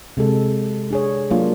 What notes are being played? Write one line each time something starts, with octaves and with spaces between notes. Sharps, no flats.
C3 G#3 A4
D4 G#4 C#5
F#3 A#3 D4 F4